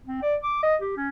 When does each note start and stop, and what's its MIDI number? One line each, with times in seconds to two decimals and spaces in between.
0.06 0.22 60
0.22 0.35 74
0.43 0.62 86
0.63 0.75 75
0.81 0.93 67
0.97 1.09 61